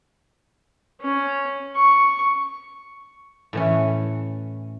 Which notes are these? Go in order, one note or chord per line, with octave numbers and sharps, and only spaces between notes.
C#4
C#6
A2 E3 C#4